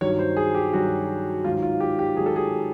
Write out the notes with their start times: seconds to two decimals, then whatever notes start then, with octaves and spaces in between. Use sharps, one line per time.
0.01 G2 D#3 F#3 C#5
0.19 C5
0.37 G#4
0.55 G4
0.73 G2 D#3 F#3 F#4
1.44 G#2 D#3 F#3 F4
1.62 F4
1.80 G4
1.99 G4
2.17 G#2 D#3 F#3 G#4
2.26 A4
2.36 G#4